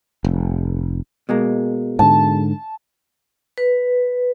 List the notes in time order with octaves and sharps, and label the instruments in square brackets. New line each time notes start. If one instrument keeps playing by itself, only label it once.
[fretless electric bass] F1
[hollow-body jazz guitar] B2 G#3 A#3
[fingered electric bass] G#2 D3 [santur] A5
[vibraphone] B4